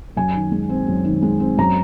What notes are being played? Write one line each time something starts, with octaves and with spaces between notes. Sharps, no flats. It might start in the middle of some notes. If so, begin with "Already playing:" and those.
F#2 G#5
D#3
G#3
C4
F#2
D#3
G#3
C4
F#2 A#5